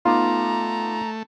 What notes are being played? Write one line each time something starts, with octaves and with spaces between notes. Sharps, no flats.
A3 B3 D#4 F4 A#5 D6